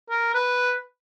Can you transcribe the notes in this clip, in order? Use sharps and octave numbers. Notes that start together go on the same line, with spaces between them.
A#4
B4